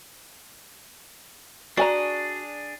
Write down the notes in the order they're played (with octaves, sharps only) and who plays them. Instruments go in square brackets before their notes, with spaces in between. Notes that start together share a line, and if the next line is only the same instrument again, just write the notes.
[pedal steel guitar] D4 G#4 [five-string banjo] F#4 G#5 A#5 [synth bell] D5